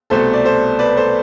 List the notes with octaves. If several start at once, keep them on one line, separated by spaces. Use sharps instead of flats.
C2 B2 A3 A4 C5
D5
A4 C5
B4 D5
A4 C5